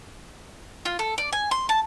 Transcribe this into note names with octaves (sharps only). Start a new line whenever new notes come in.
F4
A4
D5
G#5
C6
A5